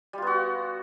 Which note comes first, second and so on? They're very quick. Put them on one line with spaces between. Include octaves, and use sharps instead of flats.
G3 F4 B3 F#4